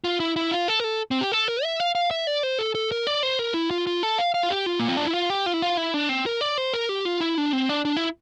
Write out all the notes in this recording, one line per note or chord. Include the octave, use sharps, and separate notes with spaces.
F4
E4
E4
F4
A4
A#4
A4
C4
G4
A4
A#4
E5
F5
F5
E5
D5
C5
A4
A4
A#4
D5
C5
A#4
E4
F4
F4
A4
F5
F5
F4
G4
F4
A#3
C4
D4
E4
F4
G4
F4
E4
F4
E4
D4
C4
A#4
D5
C5
A#4
G4
F4
E4
D4
C4
D4
D4
E4